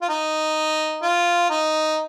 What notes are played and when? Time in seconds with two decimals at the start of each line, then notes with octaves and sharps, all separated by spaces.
0.01 F4
0.09 D#4
1.02 F4
1.49 D#4